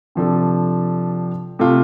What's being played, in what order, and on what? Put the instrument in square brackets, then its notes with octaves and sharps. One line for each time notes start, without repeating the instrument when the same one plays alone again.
[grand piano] C3 F3 D4 A4
C3 A3 F4